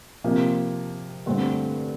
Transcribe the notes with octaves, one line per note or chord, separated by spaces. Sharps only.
C3 F3 A#3
G2 D3 A3 C4